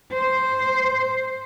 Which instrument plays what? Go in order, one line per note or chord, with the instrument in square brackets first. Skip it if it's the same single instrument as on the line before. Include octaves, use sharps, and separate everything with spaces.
[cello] C5